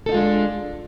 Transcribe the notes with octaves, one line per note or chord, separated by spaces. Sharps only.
G#3 D4 D#4 F4 A4